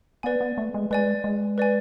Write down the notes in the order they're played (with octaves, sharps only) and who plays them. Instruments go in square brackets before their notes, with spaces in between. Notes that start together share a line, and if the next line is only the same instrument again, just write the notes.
[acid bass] B3 [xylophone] B4 D5 G#5
[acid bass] B3
A3
G#3
[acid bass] G#3 [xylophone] B4 D5 G#5
[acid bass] G#3
[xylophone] B4 D5 G#5